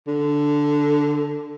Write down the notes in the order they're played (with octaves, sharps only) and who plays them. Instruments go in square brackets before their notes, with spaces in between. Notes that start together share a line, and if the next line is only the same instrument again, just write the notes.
[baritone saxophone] D3